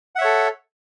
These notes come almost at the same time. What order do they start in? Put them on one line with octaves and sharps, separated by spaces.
F#5 E5 C#5 A4